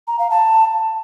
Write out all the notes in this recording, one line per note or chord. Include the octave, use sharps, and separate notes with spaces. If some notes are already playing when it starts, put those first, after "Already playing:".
A#5
F5
A5